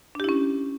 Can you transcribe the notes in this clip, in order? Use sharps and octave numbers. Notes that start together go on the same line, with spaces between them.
C#4 D4 E4 G4